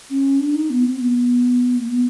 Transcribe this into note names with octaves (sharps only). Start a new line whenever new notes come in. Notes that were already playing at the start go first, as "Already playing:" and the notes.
C#4
D4
D#4
B3
C4
B3
A#3
B3